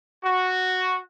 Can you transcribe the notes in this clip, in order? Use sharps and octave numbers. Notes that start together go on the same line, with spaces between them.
F#4